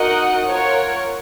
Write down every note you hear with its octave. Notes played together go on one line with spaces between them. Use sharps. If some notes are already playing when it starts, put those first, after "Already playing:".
Already playing: D#4 F#4 A#4 D#5 F#5
F4 A#4 C#5 F#5